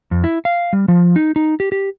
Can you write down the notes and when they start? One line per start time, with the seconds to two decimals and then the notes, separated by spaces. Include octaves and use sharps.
0.11 F2
0.24 E4
0.45 F5
0.73 G3
0.88 F3
1.16 D#4
1.36 D#4
1.60 G4
1.72 G4